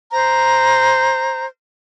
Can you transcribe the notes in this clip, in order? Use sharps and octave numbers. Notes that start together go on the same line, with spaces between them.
C5 A#5